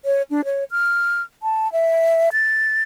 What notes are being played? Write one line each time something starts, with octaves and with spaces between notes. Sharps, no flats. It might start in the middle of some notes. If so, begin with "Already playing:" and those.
C#5
D4
C#5
F6
A5
E5
A6